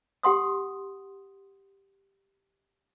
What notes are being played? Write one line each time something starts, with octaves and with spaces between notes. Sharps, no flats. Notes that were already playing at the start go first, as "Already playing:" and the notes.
G4 F#5 C6 D#6